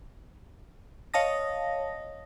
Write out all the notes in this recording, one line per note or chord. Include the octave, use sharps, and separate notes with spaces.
C#5 D#5 F5 A5 D#6 A#6